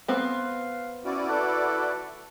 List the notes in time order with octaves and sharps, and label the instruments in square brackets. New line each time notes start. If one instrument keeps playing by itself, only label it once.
[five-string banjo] B3 C4 [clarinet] F5
[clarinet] C#4 [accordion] E4 F#4 D5
[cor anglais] A4 [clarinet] B4